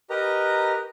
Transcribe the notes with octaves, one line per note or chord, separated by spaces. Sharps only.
G4 A#4 B4 D#5 A#5